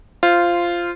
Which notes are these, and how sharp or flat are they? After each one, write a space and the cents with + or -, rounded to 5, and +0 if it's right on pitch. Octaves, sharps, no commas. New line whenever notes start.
F4 -10 C5 +0